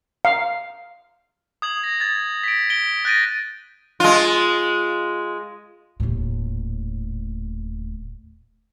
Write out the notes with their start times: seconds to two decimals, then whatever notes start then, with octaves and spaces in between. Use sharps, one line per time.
0.25 F5
1.62 D#6 G#6 F#7
1.84 A#6
2.00 G#6 A6
2.44 B6 D7
2.70 B6 D7 G7
3.05 F#6 G6 A6 A#6 D7 D#7
4.00 G#3 F4
6.00 D#1 A2